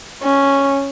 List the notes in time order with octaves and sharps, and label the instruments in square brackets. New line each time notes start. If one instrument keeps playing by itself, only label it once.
[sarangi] C#4